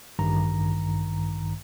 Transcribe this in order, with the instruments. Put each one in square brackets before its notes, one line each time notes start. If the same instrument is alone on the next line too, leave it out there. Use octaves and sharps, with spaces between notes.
[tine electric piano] A1 G2 D#3 A#5